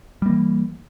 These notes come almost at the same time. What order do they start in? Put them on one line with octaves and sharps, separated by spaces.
G3 A#3 E3